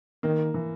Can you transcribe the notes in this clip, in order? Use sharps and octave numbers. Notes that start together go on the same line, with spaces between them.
D#3 A#3
E3